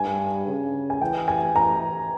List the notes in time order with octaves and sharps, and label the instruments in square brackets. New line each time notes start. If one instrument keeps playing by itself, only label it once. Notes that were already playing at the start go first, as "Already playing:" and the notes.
Already playing: [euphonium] G2 [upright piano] G#5
[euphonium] C#3
[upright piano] G#5
[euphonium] E3 [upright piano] G5
[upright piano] G#5
A#5